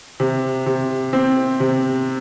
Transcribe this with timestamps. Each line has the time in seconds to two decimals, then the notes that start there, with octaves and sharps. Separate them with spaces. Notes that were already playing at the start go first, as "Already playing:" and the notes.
0.20 C3
0.66 C3
1.13 C4
1.60 C3